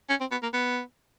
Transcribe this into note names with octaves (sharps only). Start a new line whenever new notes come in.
C#4
C4
B3
A#3
B3